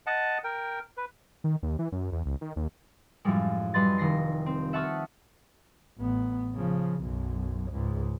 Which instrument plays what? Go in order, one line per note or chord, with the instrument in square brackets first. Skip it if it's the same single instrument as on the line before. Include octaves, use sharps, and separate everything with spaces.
[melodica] D#5 F#5 A5
A#4 G5
B4
[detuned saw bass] D#3
D#2
E3
F#2
E2
C#2
D#3
D#2
[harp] F#2 A2 F3 G3 G#3
F#2 G3 B4 D#5 C6 A6
F1 D#3 A#6 C7
C4
E5 F#5 A5 C#6 D#6 F6
[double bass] A1 B3
C#3 F3
B1 F#2
C#2 G#2